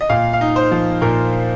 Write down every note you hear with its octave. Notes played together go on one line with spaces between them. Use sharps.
D#5
A#2 F5
F5
D#4
C5
F3
A#2 A#4